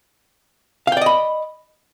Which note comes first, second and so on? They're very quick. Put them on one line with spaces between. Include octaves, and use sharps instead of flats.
F5 G5 D5 D#5 B5